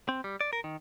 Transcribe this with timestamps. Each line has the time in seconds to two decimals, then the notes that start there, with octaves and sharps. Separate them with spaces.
0.09 C4
0.24 G3
0.41 D5
0.53 A#4
0.64 D#3